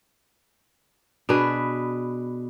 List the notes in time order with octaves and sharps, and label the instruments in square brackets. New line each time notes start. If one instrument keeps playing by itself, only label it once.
[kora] B2 D4 G#4 B4